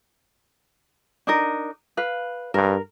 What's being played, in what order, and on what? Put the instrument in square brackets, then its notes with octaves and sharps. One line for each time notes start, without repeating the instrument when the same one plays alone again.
[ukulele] D4 D#4 A#4
B4 F5
[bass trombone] G2 [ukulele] A#4